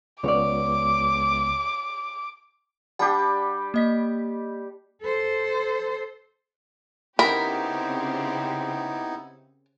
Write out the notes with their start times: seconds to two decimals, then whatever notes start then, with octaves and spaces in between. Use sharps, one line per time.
0.23 C#2 B3 C#5 D5 D6
2.99 G3 D4 G4 F#5 A5
3.74 A#3 D#5 B6
5.02 A4 C5
7.19 C#3 B3 C4 D#4 E4 G4 A#4 B5